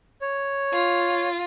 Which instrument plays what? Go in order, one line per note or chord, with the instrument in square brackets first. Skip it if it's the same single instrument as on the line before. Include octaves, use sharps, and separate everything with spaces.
[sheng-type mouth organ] C#5
[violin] F4